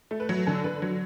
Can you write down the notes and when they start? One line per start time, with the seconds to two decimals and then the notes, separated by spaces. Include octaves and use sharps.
0.11 A3
0.20 B4
0.29 F#3
0.47 D3 A4
0.64 D3 B4
0.82 F#3